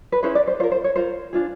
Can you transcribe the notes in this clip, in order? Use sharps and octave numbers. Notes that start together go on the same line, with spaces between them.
B4
C#4 E4 G#4 B4 C5
D5
C5
F4 A#4 C5
C5
C#5
F4 A#4 C5
D4 F4 G#4